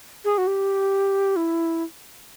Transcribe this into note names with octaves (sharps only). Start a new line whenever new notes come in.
G#4
F#4
G4
E4